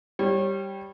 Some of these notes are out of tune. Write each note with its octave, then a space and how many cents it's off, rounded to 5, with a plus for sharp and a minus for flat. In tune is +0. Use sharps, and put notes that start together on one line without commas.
G3 +0 C#5 -25